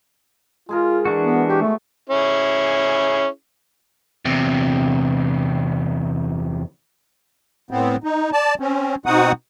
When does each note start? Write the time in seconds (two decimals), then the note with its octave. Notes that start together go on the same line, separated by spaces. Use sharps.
0.69 G#3 F4 G#4 A#4
1.05 E3 D4 F#4
1.22 B3
1.49 B2 G4 C#6
1.61 A3
2.10 C#4 E4 G#4
4.25 E2 C3
7.71 A2 B3 C4
8.04 D#4
8.33 D5 A5
8.60 C4 C#4
9.06 B2 C4 D#4 F#4 F#5 D#6